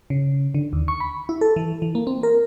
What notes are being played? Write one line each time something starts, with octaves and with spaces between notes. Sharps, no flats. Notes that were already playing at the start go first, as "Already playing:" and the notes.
C#3
D3
D#2
C#6
B5
E4
A4
E3
E3
A#3
C4
A#4